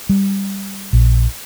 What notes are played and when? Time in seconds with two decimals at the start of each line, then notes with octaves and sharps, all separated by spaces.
0.09 G3
0.93 A#1